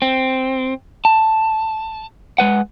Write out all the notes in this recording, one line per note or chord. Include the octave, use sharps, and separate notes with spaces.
C4
A5
G#3 B4 F#5